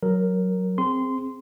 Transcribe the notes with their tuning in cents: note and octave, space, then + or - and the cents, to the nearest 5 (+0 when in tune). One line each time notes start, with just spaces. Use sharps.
F#3 +0 A#4 +0
C4 +0 G#4 +0 C6 -15